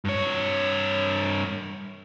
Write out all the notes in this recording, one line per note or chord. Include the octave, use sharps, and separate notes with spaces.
G2 C#5